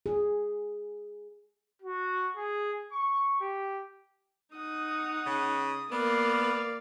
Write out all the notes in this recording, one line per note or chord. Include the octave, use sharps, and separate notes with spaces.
G#4
F#4
G#4
C#6
G4
D#4 F#5 D#6
C#3
A#3 B3 D5 F5